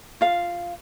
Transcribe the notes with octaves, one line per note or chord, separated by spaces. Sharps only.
F4 F5